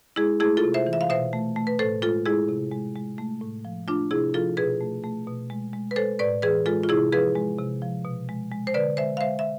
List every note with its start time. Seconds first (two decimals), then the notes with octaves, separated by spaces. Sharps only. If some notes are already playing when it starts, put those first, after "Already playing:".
0.16 G#3 E4 G#4
0.40 A3 E4 G#4
0.57 F4 A4
0.64 C3
0.74 C5 E5
0.87 E3
0.93 E5
1.01 F5
1.09 B2 C5 E5
1.33 A3
1.56 A3
1.67 B4
1.79 A2 A4 C5
2.02 G#3 F4 A4
2.26 G#3 E4 G#4
2.49 C3
2.72 G#3
2.96 G#3
3.18 A3
3.41 A2
3.65 F3
3.88 A3 D4 F4
4.11 C3 E4 G#4
4.34 F3 F4 A4
4.57 B2 G#4 B4
4.81 A3
5.04 A3
5.27 B2
5.50 G#3
5.73 G#3
5.91 B4
5.96 G#3 A4 C5
6.19 A2 B4 D5
6.42 E3 G#4 B4
6.66 G#3 F4 A4
6.83 F4
6.89 C3 E4 G#4
7.12 F3 G#4 B4
7.36 G#3
7.58 C3
7.82 F3
8.05 B2
8.29 G#3
8.52 G#3
8.67 C5
8.74 D3 B4 D5
8.97 G#3 C5 E5
9.17 F5
9.21 G#3 C5 E5
9.39 E5